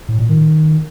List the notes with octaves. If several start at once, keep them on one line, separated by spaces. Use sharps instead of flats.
A2
A#2
D#3